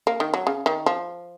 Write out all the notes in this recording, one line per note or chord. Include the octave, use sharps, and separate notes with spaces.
A#3
D#3
F#3
C#3
D#3
F3